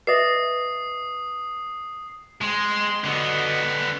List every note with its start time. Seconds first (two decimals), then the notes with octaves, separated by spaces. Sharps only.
0.07 B4 D#5 E5 D#6 C7
2.41 G#3 C4 G#4 C6
3.04 D3 B3 F#4 D#5